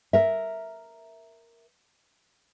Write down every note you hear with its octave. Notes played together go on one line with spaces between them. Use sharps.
A#4 E5